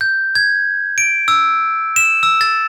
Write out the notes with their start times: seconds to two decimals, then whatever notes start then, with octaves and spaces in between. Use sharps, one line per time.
0.01 G6
0.35 G#6
0.98 D7
1.28 E6
1.96 E7
2.23 E6
2.41 A6